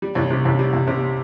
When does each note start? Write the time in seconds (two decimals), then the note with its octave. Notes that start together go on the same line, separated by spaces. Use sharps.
0.02 G3
0.15 C2
0.31 C3
0.45 C2
0.59 G3
0.73 C2
0.88 C3